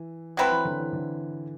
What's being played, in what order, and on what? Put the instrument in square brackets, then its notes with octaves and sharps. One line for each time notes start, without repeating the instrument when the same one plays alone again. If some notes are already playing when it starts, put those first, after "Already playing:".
Already playing: [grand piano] E3
[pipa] F#3 C4 E4 B4
[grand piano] E3
D3
E3
D3